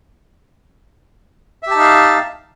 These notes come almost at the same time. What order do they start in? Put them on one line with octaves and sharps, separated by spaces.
E5 G4 A5 D#4 F5